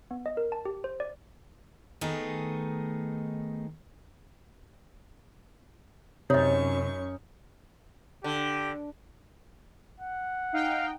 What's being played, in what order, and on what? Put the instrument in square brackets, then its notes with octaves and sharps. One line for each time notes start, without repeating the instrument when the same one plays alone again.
[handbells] B3
D#5
A#4
A5
G4
C5
D5
[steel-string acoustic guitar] D#3 A3 B3 D#4 G#4
[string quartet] F#2 C#6 [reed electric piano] C3 [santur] C#4 D#4 [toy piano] C#5 D#5
[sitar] D3 [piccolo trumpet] G4
[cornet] F#5
[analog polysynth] D#4 G5 [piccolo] F5